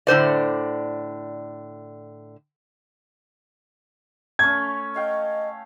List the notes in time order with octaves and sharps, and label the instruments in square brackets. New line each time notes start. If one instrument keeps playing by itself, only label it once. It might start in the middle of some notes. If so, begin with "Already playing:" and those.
[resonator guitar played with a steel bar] A2 D3 C5 D5
[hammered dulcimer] A3 C#4 [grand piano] G#6
[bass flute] D#5 [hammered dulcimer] F5 G5